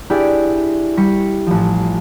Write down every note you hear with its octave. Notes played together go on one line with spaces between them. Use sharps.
D4 E4 G4 G#4 D5
G3 C#6 B6 C#7
A1 F3